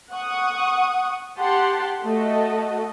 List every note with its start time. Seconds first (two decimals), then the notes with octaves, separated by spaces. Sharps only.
0.13 F#5 C#6 D#6
1.39 G4 F#5 A5 C6
2.03 A3 F#4 A4 D#5